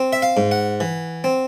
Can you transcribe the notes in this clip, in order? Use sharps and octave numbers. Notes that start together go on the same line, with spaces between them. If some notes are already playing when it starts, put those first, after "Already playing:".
Already playing: C4
E5
F5
G#2
F#5
E3
C4